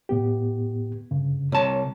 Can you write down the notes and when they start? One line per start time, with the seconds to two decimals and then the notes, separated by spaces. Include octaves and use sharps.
0.09 A2 B3 G4
1.11 G2 C#3
1.52 C2 C#5 A5